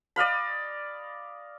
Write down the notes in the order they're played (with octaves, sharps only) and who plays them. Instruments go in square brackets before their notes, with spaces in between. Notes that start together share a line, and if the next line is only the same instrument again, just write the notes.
[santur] D5 D#5 F5 B5